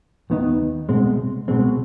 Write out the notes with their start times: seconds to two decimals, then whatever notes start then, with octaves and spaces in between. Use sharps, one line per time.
0.30 D#2 D#3 B3 D#4
0.89 C2 B2 G#3 C4
1.48 C2 B2 G#3 C4